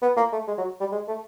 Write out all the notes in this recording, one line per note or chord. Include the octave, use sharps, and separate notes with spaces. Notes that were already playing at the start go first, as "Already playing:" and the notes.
B3
A#3
A3
G#3
F#3
G3
G#3
A3